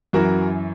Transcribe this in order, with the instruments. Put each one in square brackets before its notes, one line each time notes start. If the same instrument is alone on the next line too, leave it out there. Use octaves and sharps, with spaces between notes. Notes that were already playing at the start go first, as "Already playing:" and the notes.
[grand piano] F#2 E3 F#4 A#4